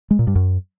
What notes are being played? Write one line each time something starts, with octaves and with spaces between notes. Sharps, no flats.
G#3
A#2
G2
F#2